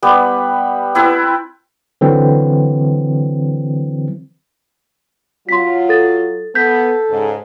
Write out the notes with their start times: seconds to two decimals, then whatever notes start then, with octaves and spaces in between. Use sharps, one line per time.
0.03 G3 B3
0.95 C4 E4 A4 B4
2.01 D3 E3 F#3 C4
5.49 F#3 F4 C6 B6
5.89 A4 A6
6.55 B3 A4 G6 B6
7.10 G#2 C#3